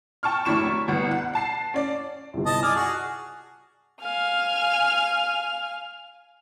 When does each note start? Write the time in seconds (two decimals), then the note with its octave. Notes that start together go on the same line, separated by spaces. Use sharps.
0.23 G5 A5 C#6 F6
0.45 F1 F#2 D4 E4 C#6 E7
0.88 G1 C2 B3
1.11 F#5
1.33 F#5 A5 C7
1.74 C#4 D5
2.33 G1 C2
2.46 D#5 A5
2.63 D5 G#5 F6
2.76 F#4 G#4
4.01 F5 G#5 F6